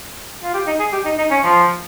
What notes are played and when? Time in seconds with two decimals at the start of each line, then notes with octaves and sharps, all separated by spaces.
0.44 F4
0.54 G4
0.67 D#4
0.79 G#4
0.92 G4
1.05 D#4
1.18 D#4
1.31 C#4
1.44 F3